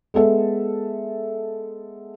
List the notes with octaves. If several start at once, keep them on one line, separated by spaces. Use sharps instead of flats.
G#3 B3 A4 E5